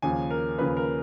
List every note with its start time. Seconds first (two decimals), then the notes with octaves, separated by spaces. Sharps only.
0.02 D#2 C#3 F3 G#5
0.31 A#4
0.58 D#2 C#3 F3 B4
0.77 A#4